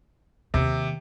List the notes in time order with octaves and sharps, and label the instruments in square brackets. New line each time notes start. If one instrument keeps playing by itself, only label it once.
[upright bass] D#2 [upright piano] C3